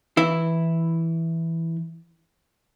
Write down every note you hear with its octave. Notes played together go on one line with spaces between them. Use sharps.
E3 E4